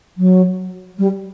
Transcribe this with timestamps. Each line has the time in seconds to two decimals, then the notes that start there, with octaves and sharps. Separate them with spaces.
0.17 F#3
0.99 G3